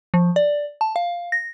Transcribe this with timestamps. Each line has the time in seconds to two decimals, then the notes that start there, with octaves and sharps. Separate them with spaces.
0.14 F3
0.36 D5
0.81 A5
0.96 F5
1.32 A#6